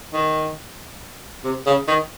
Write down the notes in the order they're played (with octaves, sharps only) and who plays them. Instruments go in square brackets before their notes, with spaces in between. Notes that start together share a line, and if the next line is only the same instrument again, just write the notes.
[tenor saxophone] D#3
C3
C#3
D#3